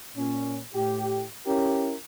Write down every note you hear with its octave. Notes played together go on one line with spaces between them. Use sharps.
A#2 C#4
A2 G4
C#4 E4 G4 A#4